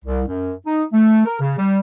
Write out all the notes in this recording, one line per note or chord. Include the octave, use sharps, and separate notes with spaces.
C2
F#2
D#4
A3
A#4
C#3
G3